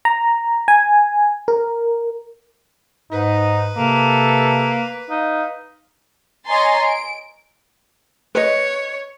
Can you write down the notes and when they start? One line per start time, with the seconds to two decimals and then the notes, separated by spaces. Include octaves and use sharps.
0.05 A#5
0.68 G#5
1.48 A#4
3.12 G#2 D#4 B4
3.78 C3 A#3 A4
5.10 D#4 F5
6.47 C#5 D#5 G#5 A#5 C6 A6
6.84 D7
8.35 B4 C#5 D#5